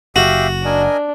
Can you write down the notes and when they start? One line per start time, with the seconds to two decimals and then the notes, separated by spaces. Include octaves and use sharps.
0.16 F#1 F#4 G4 E5 F5
0.65 D4 A#4 D#5 G#5